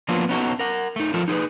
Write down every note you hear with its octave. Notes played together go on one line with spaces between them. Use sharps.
F3 F#3 A#3 B3 D4 F4
B3 C#4 D#4 E4 F#4 A4
A#4 F#5
A3 D#4
F3 F4 A4 A#4
D#4 G#4 A#4 B4